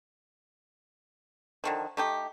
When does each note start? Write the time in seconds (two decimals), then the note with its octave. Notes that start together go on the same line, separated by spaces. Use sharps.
1.64 D3 D#3 F3
1.97 A3 D#4 G4